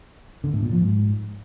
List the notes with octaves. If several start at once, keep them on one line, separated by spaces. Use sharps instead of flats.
D3
A2
A#2
F3
G#2